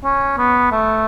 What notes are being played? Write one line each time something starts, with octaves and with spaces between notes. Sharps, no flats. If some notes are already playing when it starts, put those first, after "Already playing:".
C#4
B3
A3